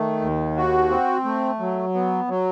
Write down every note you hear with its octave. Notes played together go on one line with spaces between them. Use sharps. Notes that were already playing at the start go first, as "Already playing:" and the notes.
Already playing: D#3 A3
D#2
F#4
C4
A3
F#3
B3
F#3